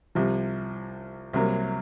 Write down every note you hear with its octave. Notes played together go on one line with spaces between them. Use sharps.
C2 C3 F3
C2 C3 F#3 A#3